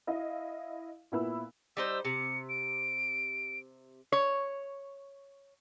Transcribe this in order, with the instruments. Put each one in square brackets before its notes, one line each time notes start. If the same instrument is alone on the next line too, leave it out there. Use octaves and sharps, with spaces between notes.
[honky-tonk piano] E4 D#5 F5
A#2 B3 E4 B5 E6
[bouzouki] G3 D#4 C5 [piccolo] E6
[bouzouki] C3 [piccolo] C#7
[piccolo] D7
[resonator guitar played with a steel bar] C#5